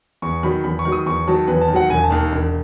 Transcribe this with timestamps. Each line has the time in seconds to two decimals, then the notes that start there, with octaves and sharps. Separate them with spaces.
0.22 E2 C#6
0.43 D#3 F#3 B5
0.64 E2 B5
0.79 C#6
0.85 D#3 F#3
0.92 D#6
1.06 E2 C#6
1.27 D#3 F#3 A5
1.48 E2 B4
1.61 A5
1.68 D#3
1.73 F#3 F#5
1.89 E1 G#5
2.04 A5
2.10 D#2 D#3
2.32 E1